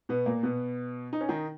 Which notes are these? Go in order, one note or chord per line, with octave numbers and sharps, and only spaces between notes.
B2 B3
A#2 A#3
B2 B3
D#4
C#4
D#3 D#4